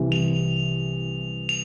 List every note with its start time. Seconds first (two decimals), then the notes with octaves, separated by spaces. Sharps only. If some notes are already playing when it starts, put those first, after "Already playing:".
Already playing: C2 C3 E3
0.12 F7
1.49 F7